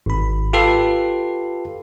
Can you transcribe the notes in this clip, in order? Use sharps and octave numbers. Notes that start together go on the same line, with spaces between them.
G#1 B5
F4 G4 A4 B4 C7